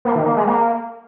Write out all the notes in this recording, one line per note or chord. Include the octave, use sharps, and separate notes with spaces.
A#3
D#3
A#3
G#3
A#3